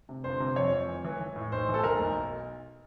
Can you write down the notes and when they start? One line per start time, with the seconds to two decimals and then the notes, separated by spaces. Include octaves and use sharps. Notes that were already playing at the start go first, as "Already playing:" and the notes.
0.09 C3
0.24 G1 C5
0.40 C3
0.56 F2 C#5
0.72 F2
0.88 E3
1.05 E3
1.21 E3
1.36 A2
1.52 B1 C5
1.69 E3
1.74 A4
1.84 B1 A#4
2.00 B1